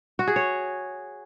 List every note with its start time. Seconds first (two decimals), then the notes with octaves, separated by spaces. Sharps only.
0.19 F#4
0.27 G#4
0.36 C#5